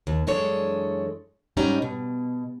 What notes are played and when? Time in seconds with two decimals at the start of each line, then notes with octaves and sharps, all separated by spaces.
0.07 D#2
0.27 F#2 E3 G#3 D4 A4 C#5
1.57 G#2 G3 C#4 D#4 A#5
1.82 B2